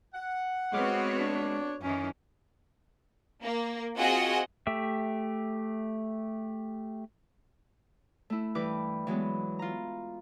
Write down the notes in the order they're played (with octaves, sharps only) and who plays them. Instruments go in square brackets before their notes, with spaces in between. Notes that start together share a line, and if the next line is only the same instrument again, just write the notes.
[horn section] F#5
[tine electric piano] G#3 D6 F6 [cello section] B3 C4 F#4 [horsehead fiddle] C#5
[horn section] D4
[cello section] F#2 D#3 E3 [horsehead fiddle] C#4
[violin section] A#3
C4 F4 F#4 G#4 D#5 F#5
[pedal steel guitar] A3 G4 E5
[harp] A3 E4
G2 E3 G4 B4 D6
E3 F#3 G#3 B3
F4 A#5